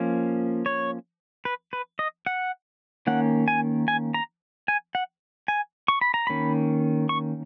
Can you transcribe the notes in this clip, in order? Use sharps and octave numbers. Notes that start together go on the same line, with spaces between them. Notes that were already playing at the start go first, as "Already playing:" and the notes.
Already playing: F3 A#3 C#4
C#5
B4
B4
D#5
F#5
D#3 A#3 C#4 F#5
G#5
G#5
A#5
G#5
F#5
G#5
C#6
B5
A#5
D#3 A#3 C#4 B5
C#6